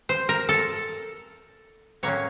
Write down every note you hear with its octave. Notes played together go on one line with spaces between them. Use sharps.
C5
A#4
A4
A2 F#3 A#3 C#4 C#5